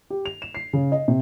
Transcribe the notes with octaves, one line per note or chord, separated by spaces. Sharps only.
G4
F7
E7
C7
C#3
D#5
C3